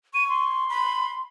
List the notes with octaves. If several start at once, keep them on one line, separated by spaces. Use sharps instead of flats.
C#6 D#7
C6
B5